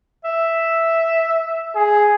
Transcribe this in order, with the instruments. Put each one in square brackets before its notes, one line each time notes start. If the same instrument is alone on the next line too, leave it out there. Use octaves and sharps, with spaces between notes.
[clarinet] E5
[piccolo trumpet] G#4